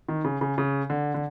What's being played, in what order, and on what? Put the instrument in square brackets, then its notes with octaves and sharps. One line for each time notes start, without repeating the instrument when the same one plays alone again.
[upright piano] D#3
C#3
C#3
C#3
D3
D3